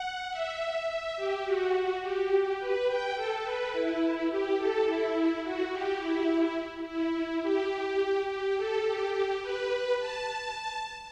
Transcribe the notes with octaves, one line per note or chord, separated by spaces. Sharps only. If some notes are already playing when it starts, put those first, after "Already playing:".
Already playing: F#5
E5
E5
G4
F#4
G4
B4
G5
A4
B4
E4
G4
A4
E4
F#4
G4
E4
E4
G4
G4
A4
G4
B4
A5